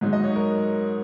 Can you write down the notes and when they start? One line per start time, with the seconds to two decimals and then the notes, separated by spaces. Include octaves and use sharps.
0.01 G#2 F#3 D#4
0.13 D#5
0.24 C#5
0.36 A#4